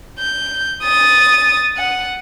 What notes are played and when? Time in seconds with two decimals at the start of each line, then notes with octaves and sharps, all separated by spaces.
0.19 G6
0.84 D#6 A6
1.77 F#5